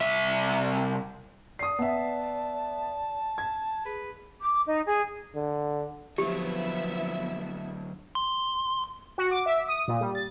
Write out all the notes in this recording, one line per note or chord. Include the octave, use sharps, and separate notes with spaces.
C2 E5
D4 D5 D#6 C7
B3 E5 A5
G#6
G#4 B4
D6
D#4
G#4
D3
D3 F3 F#3 B3 E4 G4 E5
C6
F#4
D6
E5
D#6
A#2
G3
A6